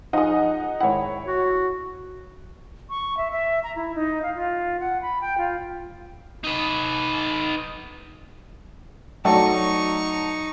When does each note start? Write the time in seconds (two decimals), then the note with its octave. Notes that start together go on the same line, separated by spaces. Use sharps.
0.13 F3 D#4 G#4 D#5 F#5
0.80 G#1 E4 C#5 F#5
1.27 F#4
2.90 C#6
3.17 E5
3.32 E5
3.63 A#5
3.76 E4
3.95 D#4
4.23 F5
4.35 F4
4.80 F#5
5.02 B5
5.21 G5
5.38 F4
6.44 D#4 B4
9.25 F#3 A3 D#4 D5 C#6